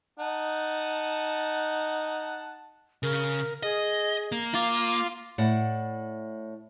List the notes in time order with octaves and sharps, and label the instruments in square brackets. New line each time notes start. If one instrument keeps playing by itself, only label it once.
[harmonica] D#4 F#5 A5
[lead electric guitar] C#3 [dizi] A#4
[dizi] G#4 [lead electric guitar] D#5
[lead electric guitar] A#3
[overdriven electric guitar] F4 [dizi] D6
[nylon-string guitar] A2 D5 F#5